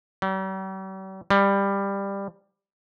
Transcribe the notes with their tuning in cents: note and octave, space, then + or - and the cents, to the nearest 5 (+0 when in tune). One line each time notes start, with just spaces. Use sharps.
G3 -45
G3 +15